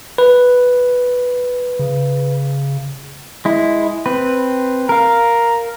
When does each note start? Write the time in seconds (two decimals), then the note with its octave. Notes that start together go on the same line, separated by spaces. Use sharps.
0.18 B4
1.79 C#3
3.45 G#3 E4
4.06 C4 B4
4.89 A#4 F5 A#5